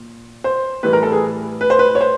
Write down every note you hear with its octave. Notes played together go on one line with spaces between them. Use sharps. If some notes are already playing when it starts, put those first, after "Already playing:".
Already playing: A#2
C5
A2 E3 G3 B4
A#4
A4
G#4
B4
C5
B4
C#5
C5